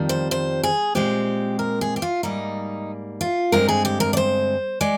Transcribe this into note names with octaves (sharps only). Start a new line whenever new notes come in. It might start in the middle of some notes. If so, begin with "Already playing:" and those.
Already playing: F2 D#3 G3
C5
C5
G#4
A#2 G#3 C4 G4
A#4
G#4
G4
F4
G#2 G3 A#3 D#4
F4
G2 D3 G#3 C4 A#4
G#4
G4
A#4
D5
C5
G#3 D5